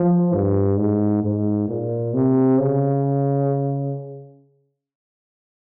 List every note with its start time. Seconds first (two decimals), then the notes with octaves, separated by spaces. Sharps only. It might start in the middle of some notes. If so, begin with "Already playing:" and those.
Already playing: F3
0.34 G2
0.78 G#2
1.23 G#2
1.69 A#2
2.14 C3
2.59 C#3